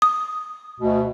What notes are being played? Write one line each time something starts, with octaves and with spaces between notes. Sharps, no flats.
D#6
D2 B2